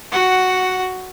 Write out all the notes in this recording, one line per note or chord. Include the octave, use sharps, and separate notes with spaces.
F#4 F#5